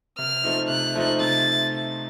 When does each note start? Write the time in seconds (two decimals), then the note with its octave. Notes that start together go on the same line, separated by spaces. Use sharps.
0.18 C3 F6
0.44 F3 A3 C4 D#4
0.69 C3 F#6
0.95 F3 A3 C4 D#4
1.20 C3 A6